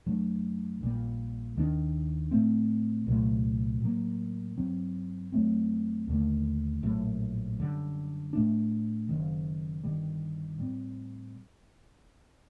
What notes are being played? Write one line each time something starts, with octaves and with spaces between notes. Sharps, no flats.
F#2 F#3 A3 D4
A#1 A#2 G3
D#2 D#3 G3 D4
A2 A3 C4
C2 A#2 F#3 A3
A2 F#3 A#3
G2 F#3 C4
F#2 F#3 A3 C4
D#2 D3 A3
A#1 A2 F#3 A3
F#2 D3 G3
A2 A3 D4
F#1 F#2 D#3
G1 G2 D#3 G3
A2 G3 C4